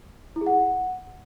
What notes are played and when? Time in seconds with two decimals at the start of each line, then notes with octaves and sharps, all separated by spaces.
0.36 E4
0.41 G#4
0.46 F#5